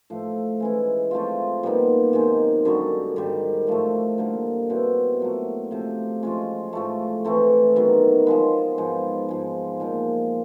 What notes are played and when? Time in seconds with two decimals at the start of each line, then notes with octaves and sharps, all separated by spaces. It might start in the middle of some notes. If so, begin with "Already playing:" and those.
0.10 A2 F3 A3
0.60 E3 G#3 C#4 E4
1.11 F3 A3 C4 F4
1.63 A#2 G3 B3 D#4
2.13 C3 D#3 G#3
2.65 F#2 D3 G3
3.16 G#2 D#3 G3
3.67 A2 F3 A3
4.18 D3 G3 A#3
4.70 B2 G3 C4 E4
5.20 A#2 F#3 A3
5.71 C3 F3 A3
6.23 F3 G#3 C#4 F4
6.73 A2 F3 A3
7.25 E3 A3 C4
7.76 D#3 F#3 B3
8.27 F3 G#3 B3
8.78 G#2 F3 G#3
9.29 G#2 F3 G#3
9.80 A#2 F3 G#3